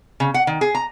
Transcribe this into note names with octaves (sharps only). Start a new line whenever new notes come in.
C#3
F#5
D#3
G#4
A#5